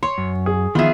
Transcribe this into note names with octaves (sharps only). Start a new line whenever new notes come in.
C#5 C6
F#2
G#4
D#3 F3 B3 F4 G#4 E5